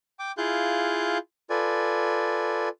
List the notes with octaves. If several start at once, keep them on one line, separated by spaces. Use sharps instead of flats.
G5 D6
E4 F4 G#4 F5 F#6 G6
F4 A4 B4 D5 G#5